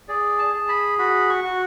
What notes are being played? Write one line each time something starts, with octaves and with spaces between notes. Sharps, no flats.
G#4 D5
A5
G#4
B5
F#4 B5
C#6
F#4